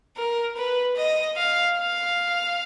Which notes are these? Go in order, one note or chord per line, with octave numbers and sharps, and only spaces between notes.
A#4
B4
D#5
F5
F5